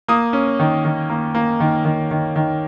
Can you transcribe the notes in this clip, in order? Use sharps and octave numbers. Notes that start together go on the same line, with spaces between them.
A#3 D#6
C#4
D#3
D#3
A#3
A#3
D#3
D#3
D#3
D#3